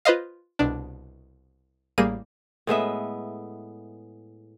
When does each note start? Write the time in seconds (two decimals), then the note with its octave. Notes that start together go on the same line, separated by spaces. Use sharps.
0.05 F4 B4 C5 D#5 F5
0.59 C2 B2 D4
1.98 A1 G3 A#3 G#4 D#7
2.67 A2 G#3 B3 E5